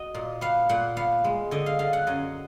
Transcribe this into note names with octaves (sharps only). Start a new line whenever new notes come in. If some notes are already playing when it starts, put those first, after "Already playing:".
Already playing: F#4 D#5
A#2
B3 F5
A#2 F#5
B3 F5
G#3
D3 D#5
F5
D3 F5
F#5
F#2 D#5